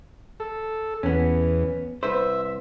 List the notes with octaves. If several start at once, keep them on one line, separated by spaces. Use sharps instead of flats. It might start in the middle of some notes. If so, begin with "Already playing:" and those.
A4
E2 B3 C#4
C2 B4 C5 E5